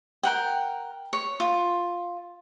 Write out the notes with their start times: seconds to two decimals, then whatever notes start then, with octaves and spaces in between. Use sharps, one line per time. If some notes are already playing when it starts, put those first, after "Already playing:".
0.23 A#4 F#5 G5
1.13 C#5
1.40 F4